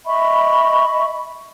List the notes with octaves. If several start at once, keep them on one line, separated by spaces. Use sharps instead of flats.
D#5 E5 B5 C#6